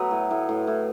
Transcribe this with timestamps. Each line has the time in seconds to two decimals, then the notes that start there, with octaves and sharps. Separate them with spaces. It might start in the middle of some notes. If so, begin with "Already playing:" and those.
Already playing: F#3 A3 B3 B4
0.11 A2
0.31 A2
0.49 A2
0.67 A2